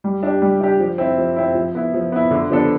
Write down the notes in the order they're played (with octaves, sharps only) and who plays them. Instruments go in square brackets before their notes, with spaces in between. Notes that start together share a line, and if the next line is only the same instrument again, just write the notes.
[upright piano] G3
D4 G4
G3
D4 G4
F3
C4 E4
F3
C4 E4
F3
B3 E4
F3
B3 E4
D3
F3 B3 D4 A4